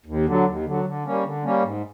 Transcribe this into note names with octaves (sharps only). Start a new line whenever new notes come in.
D#2
D3 F#3
D#2
D3 F#3
D3
G3 A#3 C#4
D3
G3 A#3 C#4
G#2